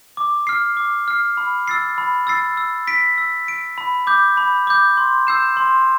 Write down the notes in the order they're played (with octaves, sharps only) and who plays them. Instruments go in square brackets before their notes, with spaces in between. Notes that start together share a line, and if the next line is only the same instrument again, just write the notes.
[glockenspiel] D6
F6 C7
D6
F6 C7
B5
E6 A6 C7
B5
E6 A6 C7
E6
B6 D7
E6
B6 D7
B5
D6 G6
B5
D6 G6
C6
E6 G6 C7 E7
C6